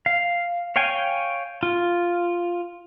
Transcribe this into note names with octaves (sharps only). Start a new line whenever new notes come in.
F5
C#5 F5 G5 G#5
F4